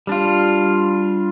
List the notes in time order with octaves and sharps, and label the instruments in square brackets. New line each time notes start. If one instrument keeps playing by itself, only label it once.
[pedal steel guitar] G3 D4 F4